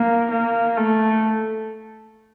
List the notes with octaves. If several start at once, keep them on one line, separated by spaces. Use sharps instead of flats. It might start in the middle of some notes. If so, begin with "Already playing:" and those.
Already playing: A#3
A#3
A3